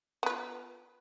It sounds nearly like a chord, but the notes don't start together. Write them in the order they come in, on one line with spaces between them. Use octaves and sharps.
B3 B4 F4